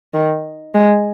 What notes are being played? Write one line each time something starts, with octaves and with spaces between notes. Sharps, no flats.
D#3
G#3